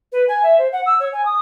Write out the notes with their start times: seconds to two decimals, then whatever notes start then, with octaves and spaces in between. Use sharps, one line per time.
0.12 B4
0.28 G#5
0.43 E5
0.58 C5
0.72 F#5
0.86 E6
1.00 C#5
1.13 G#5
1.25 D#6